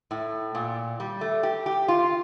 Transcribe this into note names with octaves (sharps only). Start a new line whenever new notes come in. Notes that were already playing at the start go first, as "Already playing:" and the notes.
A2
A#2
G3
A3
G4
G4
F4